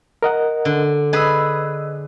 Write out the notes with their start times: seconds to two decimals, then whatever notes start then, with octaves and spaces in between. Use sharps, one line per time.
0.22 A#4 D#5 F#5
0.65 D3
1.13 G#4 B4 D#5 E6